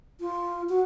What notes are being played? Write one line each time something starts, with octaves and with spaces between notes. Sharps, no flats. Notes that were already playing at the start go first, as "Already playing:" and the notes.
F4
F#4